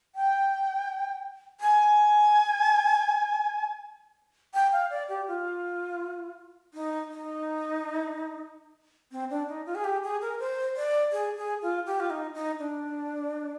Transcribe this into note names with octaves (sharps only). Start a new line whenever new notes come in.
G5
G#5
G5
F5
D5
G4
F4
D#4
D#4
C4
D4
D#4
F4
G#4
G4
G#4
A#4
C5
D5
G#4
G#4
F4
G4
F4
D#4
D#4
D4